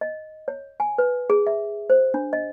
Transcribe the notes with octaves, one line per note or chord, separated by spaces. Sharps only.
D#5
C#5
G#5
B4
G#4
E5
C5
D4
D#5